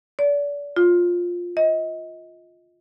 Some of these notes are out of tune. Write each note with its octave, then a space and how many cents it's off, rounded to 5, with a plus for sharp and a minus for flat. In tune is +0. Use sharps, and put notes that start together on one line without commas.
D5 -35
F4 +10
D#5 +30